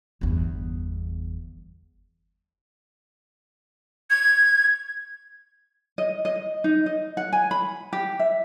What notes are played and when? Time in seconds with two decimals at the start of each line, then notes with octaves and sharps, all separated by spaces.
0.21 G1 E2
4.10 G#6
5.98 D#5
6.25 D#5
6.64 D#4
6.86 D#5
7.17 F#5
7.33 G#5
7.51 B5
7.93 G4
8.19 E5